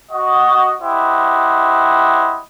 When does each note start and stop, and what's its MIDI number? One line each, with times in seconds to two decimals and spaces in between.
0.11 0.75 66
0.11 0.75 75
0.81 2.40 64
0.81 2.40 67
0.81 2.40 72
0.81 2.40 75
0.81 2.40 78